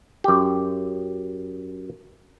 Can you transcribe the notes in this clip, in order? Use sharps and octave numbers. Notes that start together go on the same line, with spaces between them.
F#2 G4